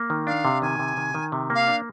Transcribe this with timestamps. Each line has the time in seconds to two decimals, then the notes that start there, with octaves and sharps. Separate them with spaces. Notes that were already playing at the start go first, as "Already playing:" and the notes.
Already playing: A#3
0.10 D#3
0.27 D4 F5
0.45 C3
0.62 D#3 G#5
0.79 C3
0.97 D#3
1.14 D#3
1.32 C3
1.50 A#3 F5
1.67 D4